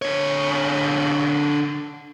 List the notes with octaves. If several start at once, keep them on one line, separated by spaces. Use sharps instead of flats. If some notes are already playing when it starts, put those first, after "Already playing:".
D3 C#5